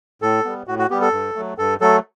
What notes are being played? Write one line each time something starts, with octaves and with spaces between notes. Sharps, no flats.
A2 A4
G3 B3
A2 F#4
F#4
G3 B3 G4
A4
G2
F#3 A3
G2 A4
F#3 A3 A4